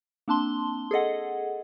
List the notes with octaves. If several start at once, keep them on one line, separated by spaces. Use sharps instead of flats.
A#3 C4 D4 A5 C6 G7
G#4 A4 D#5 F#5